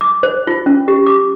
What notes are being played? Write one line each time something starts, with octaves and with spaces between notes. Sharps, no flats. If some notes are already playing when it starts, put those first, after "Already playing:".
D6
C5
F4
C#4
G4
D6